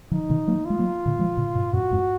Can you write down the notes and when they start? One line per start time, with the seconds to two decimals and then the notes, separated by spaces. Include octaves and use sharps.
0.11 D3 F3 D#4
0.30 B2 D#3
0.47 F#3 A#3
0.65 G#3 F4
0.79 F#3 A#3
1.06 A#2 D3
1.19 F3 G#3
1.37 A#2 D3
1.55 G#2 B2
1.73 F#2 A#2 F#4
1.91 F2 G#2